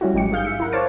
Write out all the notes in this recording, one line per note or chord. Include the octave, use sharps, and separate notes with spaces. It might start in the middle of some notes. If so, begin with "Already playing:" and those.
G3 C#4 E4 F#4
A1 F#3 G#3 G4 C#7
G#2 G#4 F5 G6
E5 C#7
E4 A#4 F#5
C5 C#5 F5 A5 D6